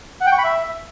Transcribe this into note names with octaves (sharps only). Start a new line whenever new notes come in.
F#5
G5
C#6
B5
E5